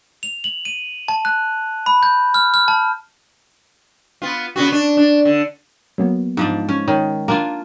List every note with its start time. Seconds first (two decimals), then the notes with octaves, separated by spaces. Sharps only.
0.23 F7
0.44 F#7
0.65 D#7
1.08 A5
1.25 F#6
1.86 B5
2.03 G6
2.34 F6
2.54 F6
2.68 A5
4.22 B3 F4
4.56 C#3 B3 F#4
4.72 D4
4.97 D4
5.25 D3
5.98 F#3 A#3 B3
6.37 G#2 F3 D4
6.69 C#4
6.88 D#3 C#5 D#6
7.28 A#3 D4 F4